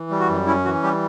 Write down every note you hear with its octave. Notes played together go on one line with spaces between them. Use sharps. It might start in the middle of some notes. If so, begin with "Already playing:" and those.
Already playing: E3
G3
F#4
F#2
C#4 E4
E3 F#4
G3 G4